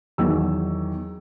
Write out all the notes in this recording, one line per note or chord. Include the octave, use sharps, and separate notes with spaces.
E2 D#3 F#3 E6